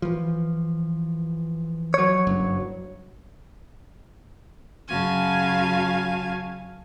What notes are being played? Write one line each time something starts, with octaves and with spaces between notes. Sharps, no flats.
E3 F3
F#3 C#5
F#1 G2
F#2 C#3 F#4 F5 G#5 A5